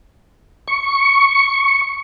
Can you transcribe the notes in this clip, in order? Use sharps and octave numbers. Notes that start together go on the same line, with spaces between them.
C#6